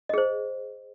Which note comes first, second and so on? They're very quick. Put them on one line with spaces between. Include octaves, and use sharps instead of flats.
D#5 G#4 C5